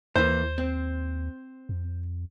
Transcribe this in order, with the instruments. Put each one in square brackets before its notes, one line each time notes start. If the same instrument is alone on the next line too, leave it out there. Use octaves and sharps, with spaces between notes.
[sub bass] D#2 [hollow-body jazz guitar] E3 A#3 [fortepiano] C5
[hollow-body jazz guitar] C4
[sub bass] F2